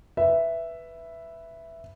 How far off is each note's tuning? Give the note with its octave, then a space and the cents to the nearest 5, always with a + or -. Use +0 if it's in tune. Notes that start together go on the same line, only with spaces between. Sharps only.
B4 +0 E5 +5